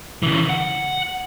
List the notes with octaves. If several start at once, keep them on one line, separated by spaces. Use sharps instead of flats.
C#3 E3
F#5